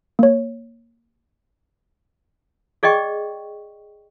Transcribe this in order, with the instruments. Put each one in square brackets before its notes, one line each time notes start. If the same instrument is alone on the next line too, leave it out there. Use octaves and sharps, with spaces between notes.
[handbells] A#3 C#5
[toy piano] G#4 D5 D#5 G5 C#6